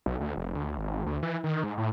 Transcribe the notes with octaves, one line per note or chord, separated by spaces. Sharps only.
B1
D2
F1
D2
G#1
D2
E3
D#3
G#2
A2